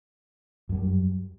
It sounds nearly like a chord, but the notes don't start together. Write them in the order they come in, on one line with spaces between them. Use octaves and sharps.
F#2 F#3 G3